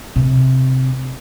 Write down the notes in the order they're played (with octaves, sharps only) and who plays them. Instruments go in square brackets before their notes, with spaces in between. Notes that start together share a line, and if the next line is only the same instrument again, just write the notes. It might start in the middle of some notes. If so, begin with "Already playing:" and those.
[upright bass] C3